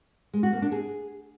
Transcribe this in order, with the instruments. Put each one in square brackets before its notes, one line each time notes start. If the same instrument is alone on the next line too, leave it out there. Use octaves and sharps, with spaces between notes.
[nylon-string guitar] G#3
F#4
A#3
D4
G#4